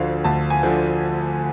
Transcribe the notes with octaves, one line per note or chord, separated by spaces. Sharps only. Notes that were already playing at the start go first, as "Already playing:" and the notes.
Already playing: D2 D3 F3 F5
D2 A5
G#5
D3 F3